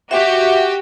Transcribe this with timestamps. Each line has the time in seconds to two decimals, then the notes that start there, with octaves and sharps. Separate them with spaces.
0.11 F#4 G4 E5